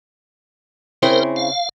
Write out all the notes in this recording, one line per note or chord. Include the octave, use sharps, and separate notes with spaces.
C#3 C4 E4 A#4 C5
F5